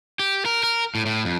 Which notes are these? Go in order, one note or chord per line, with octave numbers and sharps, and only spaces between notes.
G4
A#4
A#4
A2
A2
F2